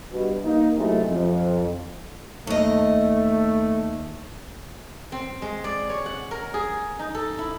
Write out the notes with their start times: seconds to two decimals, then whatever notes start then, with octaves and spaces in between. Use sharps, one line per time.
0.11 G2 B2
0.44 A#3 D#4
0.77 F#2 C3 F#3 G#3 A3 E4
1.09 F2
2.47 D#2 A3 D#5
5.12 C4
5.42 G#3
5.64 D5
5.89 C#5
6.06 F#5
6.31 A#4
6.54 G#4
6.99 D#4
7.15 A4
7.38 E4